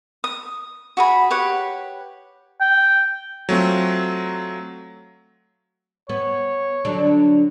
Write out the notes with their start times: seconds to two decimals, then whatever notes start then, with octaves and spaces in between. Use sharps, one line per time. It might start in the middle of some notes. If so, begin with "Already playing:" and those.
0.24 D#6
0.97 F#4 G#4 B5
1.30 G4 B4 C#5 F#5
2.61 G5
3.49 F#3 A3 C4 F4
6.09 B3 C#5
6.85 D3 F#3 D4